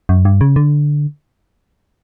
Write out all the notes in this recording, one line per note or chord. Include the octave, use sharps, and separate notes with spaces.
F#2
G2
C#3
D3